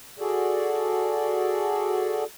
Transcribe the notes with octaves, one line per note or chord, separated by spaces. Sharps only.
F#4 G#4 A4 D5